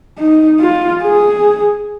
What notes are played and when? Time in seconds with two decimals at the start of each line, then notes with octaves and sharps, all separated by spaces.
0.18 D#4
0.60 F4
1.02 G#4